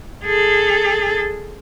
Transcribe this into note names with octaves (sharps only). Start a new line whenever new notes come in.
G#4 A4